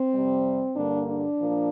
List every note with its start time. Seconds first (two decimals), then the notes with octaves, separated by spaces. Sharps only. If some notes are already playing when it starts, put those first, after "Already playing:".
Already playing: C4
0.14 F2 C3 G3
0.75 G2 D3 G3 A#3 D4
1.07 D4
1.39 A#2 F3 A#3